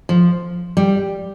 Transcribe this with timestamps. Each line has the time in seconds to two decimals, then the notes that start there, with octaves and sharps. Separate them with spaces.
0.09 F3
0.77 G3